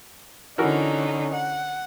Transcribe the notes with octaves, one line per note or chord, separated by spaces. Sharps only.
D3 E3 C#4 D#4 F#4 A#4
F#5